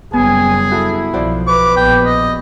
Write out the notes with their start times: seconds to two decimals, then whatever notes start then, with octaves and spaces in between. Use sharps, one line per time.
0.13 F#1 G3 B3 G#4 G#5
0.71 E4 F#4 A4
1.13 B1 F3 F#4 C5 D5
1.47 B4 D6
1.77 A#1 B3 G5
2.05 D#5